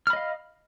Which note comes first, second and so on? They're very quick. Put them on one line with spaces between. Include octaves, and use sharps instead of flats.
F6 B5 D#5 F5